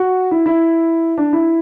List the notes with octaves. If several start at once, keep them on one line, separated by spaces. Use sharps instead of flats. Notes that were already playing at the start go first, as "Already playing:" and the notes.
Already playing: F#4
E4
E4
D4
E4